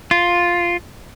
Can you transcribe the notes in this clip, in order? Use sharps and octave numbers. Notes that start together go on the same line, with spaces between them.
F4